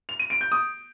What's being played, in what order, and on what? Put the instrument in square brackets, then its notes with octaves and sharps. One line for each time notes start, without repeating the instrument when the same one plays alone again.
[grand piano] F7
D#7
D7
G6
D#6